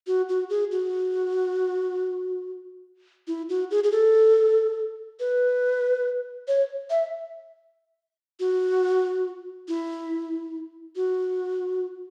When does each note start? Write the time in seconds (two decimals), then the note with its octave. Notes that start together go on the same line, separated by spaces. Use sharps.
0.07 F#4
0.29 F#4
0.50 G#4
0.71 F#4
3.28 E4
3.49 F#4
3.71 G#4
3.84 G#4
3.92 A4
5.20 B4
6.48 C#5
6.90 E5
8.40 F#4
9.68 E4
10.96 F#4